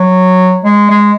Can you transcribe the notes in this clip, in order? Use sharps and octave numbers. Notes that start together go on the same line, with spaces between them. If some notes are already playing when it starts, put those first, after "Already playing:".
Already playing: F#3
G#3
G#3